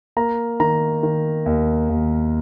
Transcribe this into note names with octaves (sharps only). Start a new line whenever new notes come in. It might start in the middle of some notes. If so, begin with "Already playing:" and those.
A#3 A#5
D#3 A#5
D#3
D#2
D#2